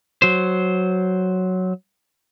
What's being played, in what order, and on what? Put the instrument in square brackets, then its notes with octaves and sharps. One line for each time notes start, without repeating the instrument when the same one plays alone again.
[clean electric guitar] F#3 C5